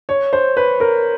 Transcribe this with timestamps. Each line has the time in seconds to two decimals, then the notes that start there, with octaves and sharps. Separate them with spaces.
0.09 C#5
0.33 C5
0.57 B4
0.80 A#4